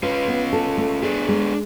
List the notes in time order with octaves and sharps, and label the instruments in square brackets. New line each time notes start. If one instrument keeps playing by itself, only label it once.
[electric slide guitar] C#4 F4 [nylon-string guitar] B4
[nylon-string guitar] B3
A4
A3
[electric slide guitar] B3 D4 [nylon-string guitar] G#4
[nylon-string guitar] G#3